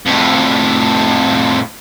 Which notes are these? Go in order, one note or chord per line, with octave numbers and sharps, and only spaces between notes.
F2 A2